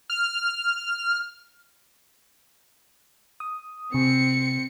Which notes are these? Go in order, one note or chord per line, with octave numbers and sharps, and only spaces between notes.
F6
D#6
C3 C4 C#7